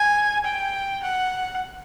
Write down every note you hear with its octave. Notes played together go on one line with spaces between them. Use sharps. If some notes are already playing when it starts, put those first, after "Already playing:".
Already playing: G#5
G5
F#5